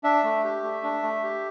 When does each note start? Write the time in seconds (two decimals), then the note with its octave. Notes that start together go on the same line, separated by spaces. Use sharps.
0.04 D4 E5
0.23 A3
0.44 G4
0.63 A3
0.83 D4
1.03 A3
1.24 G4